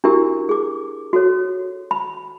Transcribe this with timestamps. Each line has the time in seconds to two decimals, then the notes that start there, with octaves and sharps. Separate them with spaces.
0.04 D4 E4 F#4 G4 A#4
0.49 G#4 D6
1.13 F#4 A4 C#5
1.91 B5